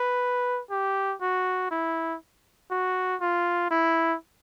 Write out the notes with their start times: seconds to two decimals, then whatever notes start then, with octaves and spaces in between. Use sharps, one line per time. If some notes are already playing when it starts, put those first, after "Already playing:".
Already playing: B4
0.70 G4
1.21 F#4
1.71 E4
2.71 F#4
3.21 F4
3.71 E4